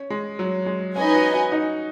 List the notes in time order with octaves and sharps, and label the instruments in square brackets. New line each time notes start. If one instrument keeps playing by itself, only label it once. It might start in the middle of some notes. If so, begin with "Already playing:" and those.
Already playing: [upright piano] C#4
G#3
F#3
G#3
[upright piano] C#4 [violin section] D#4 B4 D#5 G#5
[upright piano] F#4
F#4
D#4